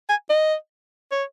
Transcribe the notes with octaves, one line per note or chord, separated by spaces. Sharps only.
G#5
D#5
C#5